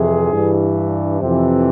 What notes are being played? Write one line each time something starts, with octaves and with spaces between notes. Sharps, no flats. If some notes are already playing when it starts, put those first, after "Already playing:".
Already playing: F2 C3 E3 G#4
G2 E3
F2 C3 E3